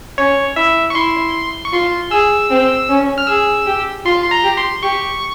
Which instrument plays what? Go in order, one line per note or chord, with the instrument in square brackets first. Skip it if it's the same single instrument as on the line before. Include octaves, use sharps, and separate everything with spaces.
[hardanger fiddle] C#4 [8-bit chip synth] C#5
[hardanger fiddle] E4 [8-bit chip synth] E5
[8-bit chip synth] C#6
[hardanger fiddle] E4 [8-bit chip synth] C6
[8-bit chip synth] C#6
[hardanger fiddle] F4 [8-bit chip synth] C6
[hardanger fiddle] G#4 [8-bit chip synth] E6
[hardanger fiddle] C4
C#4
[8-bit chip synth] F6
[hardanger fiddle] G#4 [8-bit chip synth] E6
[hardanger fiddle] G4
[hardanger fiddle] F4 [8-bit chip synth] C6
[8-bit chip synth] C6
A#5
[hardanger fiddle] G4
[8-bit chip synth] C6
[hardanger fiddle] G4 [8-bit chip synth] C#6